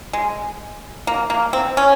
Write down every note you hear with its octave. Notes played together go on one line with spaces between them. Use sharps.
G#3
A#3
A#3
C4
C#4